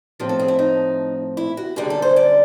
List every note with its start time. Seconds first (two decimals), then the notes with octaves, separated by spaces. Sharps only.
0.19 A2 F3 A3 C4
0.29 A4
0.39 G#4
0.48 E4
0.59 D#4
1.37 E4
1.57 F#4
1.76 F#2 D3 G3 G#4
1.90 A4
2.02 C5
2.16 D5